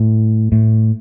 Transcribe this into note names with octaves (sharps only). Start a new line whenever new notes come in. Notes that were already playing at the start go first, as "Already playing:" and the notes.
Already playing: A2
A2